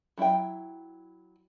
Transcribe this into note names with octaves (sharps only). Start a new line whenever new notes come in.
F#3 E4 E5 G5